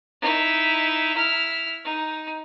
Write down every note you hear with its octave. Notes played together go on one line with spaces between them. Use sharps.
D#4 E4
E4 F6
D#4